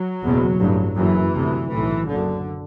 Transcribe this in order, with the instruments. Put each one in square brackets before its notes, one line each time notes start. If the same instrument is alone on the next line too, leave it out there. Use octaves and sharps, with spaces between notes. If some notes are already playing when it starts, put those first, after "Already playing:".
Already playing: [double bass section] F#3
F#1 E2 B2
A1 G2
F#1 F#2 E3
D2 C3
B1 A2 E3
F#1 F#2 D3